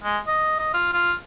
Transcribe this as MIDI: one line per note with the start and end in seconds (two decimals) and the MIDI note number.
0.04 0.18 56
0.27 0.58 75
0.59 0.71 75
0.74 0.89 65
0.93 1.14 65